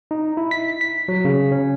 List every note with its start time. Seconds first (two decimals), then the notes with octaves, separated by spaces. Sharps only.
0.11 D#4
0.37 E4
0.51 B6
0.81 B6
1.08 F#3
1.25 C#3
1.52 C#4